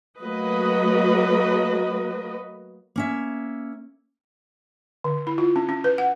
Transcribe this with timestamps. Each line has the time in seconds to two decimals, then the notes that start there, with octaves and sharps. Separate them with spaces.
0.19 F#3 A3 A#3 F#4 B4 D#5
2.96 A#3 C#4 E5
5.04 D3
5.27 E4
5.38 F4
5.56 C#4
5.69 C#4
5.84 B4
5.98 F#5